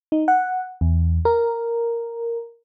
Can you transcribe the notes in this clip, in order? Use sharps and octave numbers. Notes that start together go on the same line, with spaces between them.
D#4
F#5
E2
A#4